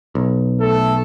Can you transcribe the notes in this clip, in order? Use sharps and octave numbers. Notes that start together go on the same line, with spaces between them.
B1
A3 A4